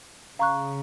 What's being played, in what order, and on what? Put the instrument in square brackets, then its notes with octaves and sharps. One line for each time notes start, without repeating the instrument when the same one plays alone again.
[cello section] C#3 [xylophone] F5 A#5 C#6 F#6